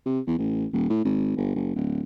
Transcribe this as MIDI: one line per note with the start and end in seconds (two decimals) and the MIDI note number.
0.06 0.20 48
0.27 0.36 40
0.38 0.66 33
0.73 0.88 27
0.89 1.03 45
1.04 1.33 32
1.36 1.51 31
1.55 1.75 30
1.75 2.01 26